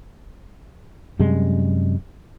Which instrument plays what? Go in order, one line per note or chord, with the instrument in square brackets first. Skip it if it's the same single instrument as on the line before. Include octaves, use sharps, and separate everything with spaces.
[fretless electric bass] F#2 C3 G3 G#3